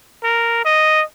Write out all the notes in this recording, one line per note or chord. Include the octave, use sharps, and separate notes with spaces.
A#4
D#5